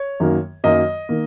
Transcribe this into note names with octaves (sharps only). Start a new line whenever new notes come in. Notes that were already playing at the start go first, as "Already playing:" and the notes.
Already playing: C#5
F#2 D#3 F#3 A#3
F#2 D#3 F#3 A#3 D#5
D#3 A#3